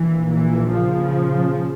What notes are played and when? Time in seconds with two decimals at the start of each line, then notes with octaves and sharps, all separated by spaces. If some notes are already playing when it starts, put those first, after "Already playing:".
Already playing: A#1 A#2 E3
0.31 E3
0.73 C#3 F3